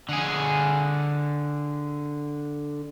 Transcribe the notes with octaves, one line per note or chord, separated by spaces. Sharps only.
D3 G#4